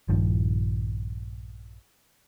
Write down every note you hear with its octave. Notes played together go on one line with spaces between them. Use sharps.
A#1 G2 D#3 F3